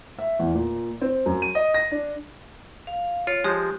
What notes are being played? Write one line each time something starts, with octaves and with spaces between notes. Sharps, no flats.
E5
E2
A#2
C4
F#2
D#7
D#5
A#6
D4
F5
F4 C#5
F3 G#3 G4